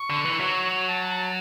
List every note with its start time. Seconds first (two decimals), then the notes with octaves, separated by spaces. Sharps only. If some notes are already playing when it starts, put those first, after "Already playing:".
Already playing: C#6
0.10 D3
0.25 E3
0.40 F#3
0.88 A5